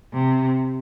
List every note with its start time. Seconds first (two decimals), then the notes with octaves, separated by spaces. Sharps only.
0.13 C3